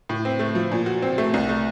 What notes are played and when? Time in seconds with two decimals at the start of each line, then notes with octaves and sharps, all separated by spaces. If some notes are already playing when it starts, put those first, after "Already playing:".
0.09 A2
0.25 C4
0.39 A3
0.55 F3
0.72 A#2
0.86 F#4
1.02 C4
1.18 A3
1.34 C2
1.49 A3